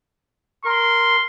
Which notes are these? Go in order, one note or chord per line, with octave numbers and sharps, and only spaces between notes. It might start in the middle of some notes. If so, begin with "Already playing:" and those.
A#4 C6